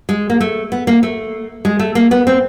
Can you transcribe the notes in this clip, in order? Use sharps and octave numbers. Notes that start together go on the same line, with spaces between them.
G#3
A#3
A3
B3
A#3
A3
G#3
A3
A#3
B3
C4